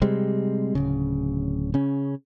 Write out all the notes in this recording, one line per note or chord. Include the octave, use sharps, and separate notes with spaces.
C3 G3 G#3 C4
D1 C#3
C#3 C#4